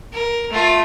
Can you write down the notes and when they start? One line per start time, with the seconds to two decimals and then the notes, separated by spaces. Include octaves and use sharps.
0.13 A#4
0.50 A3 F4